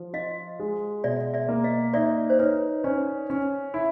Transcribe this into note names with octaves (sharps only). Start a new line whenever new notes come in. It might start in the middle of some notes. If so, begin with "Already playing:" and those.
Already playing: F3
F4 D#5 F5
G#3
B2 D5 E5
D5 E5
A#3
D#5 F5
D#4 D5 E5
C5
D#4 B4 C#5
C#4 C5 D5
C#4
E4